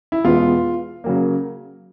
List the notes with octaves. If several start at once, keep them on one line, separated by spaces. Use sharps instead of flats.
E4
E2 B2 G#3 B3 F4
C#3 F#3 A#3